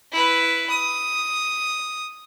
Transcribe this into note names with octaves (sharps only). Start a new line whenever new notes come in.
E4 B4
D#6